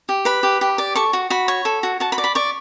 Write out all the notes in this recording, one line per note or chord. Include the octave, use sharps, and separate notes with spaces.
G4
B4 B5
G4
G4
D5
A4 C#6
F#4
F#4 B5
C#5
A4
F#4
F#4 A5
B5
D5
B5
D5 C#6